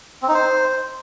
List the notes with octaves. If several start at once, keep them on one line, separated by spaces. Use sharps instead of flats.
C4
D#4
C5